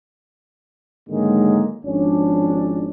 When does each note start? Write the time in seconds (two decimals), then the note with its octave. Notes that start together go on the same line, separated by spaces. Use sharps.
1.09 G#2 D3 D#3 F#3 G#3 A#3
1.85 G#1 F3 C#4 D4